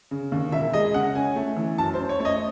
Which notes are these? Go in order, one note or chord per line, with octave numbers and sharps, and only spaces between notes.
C#3
D#2
E1 E5
G#3 D#5
C#3 F#5
C#4 G#5
A3
E3
F#2 A5
C5
C#4
C#5
A3 C#5
D#5